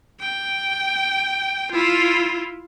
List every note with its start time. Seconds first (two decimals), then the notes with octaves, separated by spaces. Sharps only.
0.21 G5
1.72 E4 F4